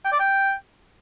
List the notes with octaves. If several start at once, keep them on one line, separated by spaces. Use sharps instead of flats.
G5
D5
G5